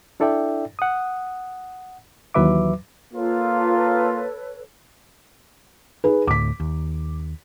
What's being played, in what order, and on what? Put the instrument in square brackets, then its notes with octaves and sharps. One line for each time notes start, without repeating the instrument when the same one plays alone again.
[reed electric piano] D4 E4 A4 D5 E5 G5
F#5 D#6
D#2 E3 F#3 B4 E5 D6
[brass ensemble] A#3 F4 [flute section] A4 B4 C#5
[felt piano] D#4 G#4 B4
[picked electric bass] D2 A2 [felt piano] D6 B6
[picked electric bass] D#2